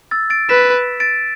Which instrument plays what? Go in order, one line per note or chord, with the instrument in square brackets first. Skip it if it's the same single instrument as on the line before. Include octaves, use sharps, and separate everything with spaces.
[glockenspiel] E6 A6
A6 D7
[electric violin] B4 [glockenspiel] B6 E7
[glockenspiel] A6 D7